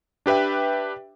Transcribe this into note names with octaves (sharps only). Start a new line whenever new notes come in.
D4 G4 B4 E5 G5